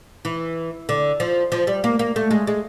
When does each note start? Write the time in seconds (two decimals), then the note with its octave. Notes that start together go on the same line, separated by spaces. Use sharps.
0.25 E3
0.89 D3
1.20 F3
1.52 F3
1.67 G3
1.84 A#3
1.99 A#3
2.16 A3
2.31 G#3
2.47 G#3